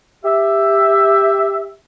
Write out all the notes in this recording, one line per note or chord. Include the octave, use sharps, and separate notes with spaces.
G4 E5